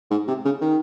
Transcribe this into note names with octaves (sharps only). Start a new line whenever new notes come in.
G#2
C3
C#3
D#3